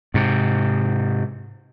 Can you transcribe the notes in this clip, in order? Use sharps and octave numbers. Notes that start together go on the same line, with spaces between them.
G#2 C3